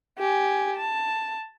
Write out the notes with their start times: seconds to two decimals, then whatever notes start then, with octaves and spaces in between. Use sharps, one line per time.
0.19 G4 G#5
0.76 A5